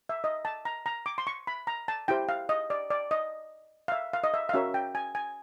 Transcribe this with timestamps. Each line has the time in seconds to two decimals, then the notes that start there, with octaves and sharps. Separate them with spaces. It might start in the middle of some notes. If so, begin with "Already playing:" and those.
0.09 E5
0.24 D#5
0.45 A5
0.65 A#5
0.86 A#5
1.06 D6
1.18 C6
1.27 C#6
1.47 B5
1.67 A#5
1.88 A5
2.08 E4 G4 C5 G5
2.29 F5
2.49 D#5
2.70 D5
2.90 D5
3.11 D#5
3.88 F5
3.92 E5
4.13 F5
4.24 D#5
4.34 E5
4.49 F5
4.53 C#4 F#4 A#4 C#5 E5
4.74 G5
4.95 G#5
5.15 G#5